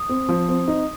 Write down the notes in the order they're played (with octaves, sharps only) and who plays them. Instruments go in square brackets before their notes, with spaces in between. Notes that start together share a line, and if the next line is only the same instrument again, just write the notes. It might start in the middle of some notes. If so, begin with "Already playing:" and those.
Already playing: [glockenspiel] D#6
[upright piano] C4
F3
C4
D#4